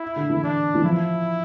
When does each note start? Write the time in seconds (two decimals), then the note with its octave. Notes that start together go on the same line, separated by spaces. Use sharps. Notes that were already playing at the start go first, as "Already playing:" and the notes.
Already playing: E4
0.16 D3
0.30 E3
0.43 D4
0.75 E3
0.84 F3 E4